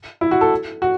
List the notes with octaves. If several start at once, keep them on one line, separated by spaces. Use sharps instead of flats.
E4
F#4
A4
F#4